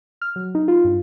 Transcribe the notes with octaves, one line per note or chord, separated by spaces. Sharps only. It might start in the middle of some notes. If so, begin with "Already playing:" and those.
F6
F#3
D#4
F4
G2